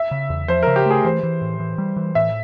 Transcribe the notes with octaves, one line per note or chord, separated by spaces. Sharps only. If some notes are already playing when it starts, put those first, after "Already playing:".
Already playing: E5
C#3
E2
F3 C5
C#3 A#4
G4
A3 G#4
E3 C5
E3
A2
E3
G3
E3
A2 E5